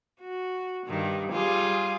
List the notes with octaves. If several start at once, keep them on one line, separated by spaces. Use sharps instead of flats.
F#4
G2 D#3
G3 F4 G#4